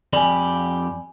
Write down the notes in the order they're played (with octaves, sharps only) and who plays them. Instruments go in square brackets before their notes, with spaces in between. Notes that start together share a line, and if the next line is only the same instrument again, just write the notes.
[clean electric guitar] F2 G4 B5 [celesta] D5 G#5